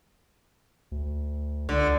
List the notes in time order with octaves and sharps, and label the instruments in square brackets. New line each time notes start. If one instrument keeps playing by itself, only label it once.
[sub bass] D2
[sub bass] C#2 [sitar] D3